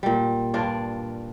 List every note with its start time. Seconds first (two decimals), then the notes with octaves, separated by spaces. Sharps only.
0.03 A#2 G3
0.54 G2 D4 F4 D5